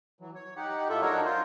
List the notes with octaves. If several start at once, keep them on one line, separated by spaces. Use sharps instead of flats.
E3 F#3
C#5
D#4 G4 F#5
A2 F4 A4 E5
F#3 D4 D#4 F#4 A#4 C#5
F4 C5